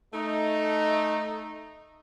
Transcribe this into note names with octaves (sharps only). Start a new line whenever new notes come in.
A3 D#4